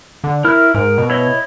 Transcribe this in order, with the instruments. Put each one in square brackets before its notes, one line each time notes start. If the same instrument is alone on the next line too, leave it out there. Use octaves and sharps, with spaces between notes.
[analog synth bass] D3
[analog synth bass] E4 [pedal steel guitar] A#4 F6
[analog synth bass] G#2 [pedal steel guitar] A#4
[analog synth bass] B2
[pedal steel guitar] E4 C#5 D#5